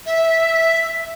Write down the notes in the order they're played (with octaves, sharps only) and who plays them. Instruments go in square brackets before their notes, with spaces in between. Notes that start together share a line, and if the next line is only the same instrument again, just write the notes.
[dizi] E5